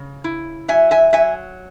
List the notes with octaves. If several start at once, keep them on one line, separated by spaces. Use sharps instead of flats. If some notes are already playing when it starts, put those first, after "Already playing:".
Already playing: C#3
E4
F#3 E5 G#5
E5 G#5
F#3 E5 G#5